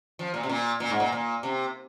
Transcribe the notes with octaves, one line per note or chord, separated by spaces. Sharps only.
F3
A#2
C3
A#2
A#2
G#2
A#2
A#2
C3